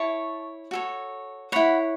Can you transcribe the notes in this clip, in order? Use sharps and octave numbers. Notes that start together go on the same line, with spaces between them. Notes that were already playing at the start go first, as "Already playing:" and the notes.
Already playing: E4 C#5 A5 C#6
F#4 A4 C#5
E4 C#5 F#5 B5